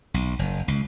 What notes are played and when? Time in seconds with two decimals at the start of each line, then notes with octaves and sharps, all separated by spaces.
0.14 B1
0.39 F#1
0.68 C#2